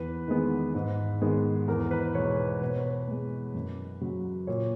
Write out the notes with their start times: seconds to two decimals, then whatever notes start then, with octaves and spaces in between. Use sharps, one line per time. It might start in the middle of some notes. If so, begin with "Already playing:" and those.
Already playing: E2 B4
0.28 D#3 G#3 B3
0.74 G#2
1.22 D#3 G#3 B3
1.68 E2 A#4
1.91 B4
2.15 B2 G#3 C#5
2.38 B4
2.61 B2 B4
2.70 C#5
2.78 B4
3.08 G#3 B3
3.55 F#2
4.01 C#3 F#3
4.47 A#2 C#5